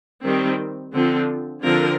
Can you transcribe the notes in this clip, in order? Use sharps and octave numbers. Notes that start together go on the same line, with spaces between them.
D#3 G3 C4
D3 F3 C4 F4
D3 F3 C4 F4 A#4